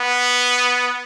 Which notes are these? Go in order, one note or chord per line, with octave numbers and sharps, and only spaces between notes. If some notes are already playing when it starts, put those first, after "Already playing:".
Already playing: B3